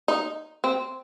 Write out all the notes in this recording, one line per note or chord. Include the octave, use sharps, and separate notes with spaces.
D#4
C4